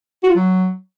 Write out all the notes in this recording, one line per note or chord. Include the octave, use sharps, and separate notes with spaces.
F#4
F4
F#3